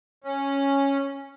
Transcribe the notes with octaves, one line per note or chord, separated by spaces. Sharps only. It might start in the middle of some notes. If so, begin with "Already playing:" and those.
C#4